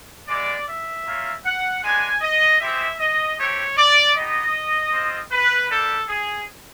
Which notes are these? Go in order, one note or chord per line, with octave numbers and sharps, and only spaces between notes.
G#3 B3 E4 D5
E5
A#3 C#4 F4
F#5
G#3 B3 D4 G#5
D#5
G#3 C4 E4 G4 E5
D#5
A3 C4 E4 G4 C#5
D5
B3 D#4 G4 D#5
C4 F4
B4
G3 A#3 D4 G4 A4
G#4